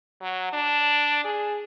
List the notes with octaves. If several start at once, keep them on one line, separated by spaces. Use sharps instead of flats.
F#3
D4
G#4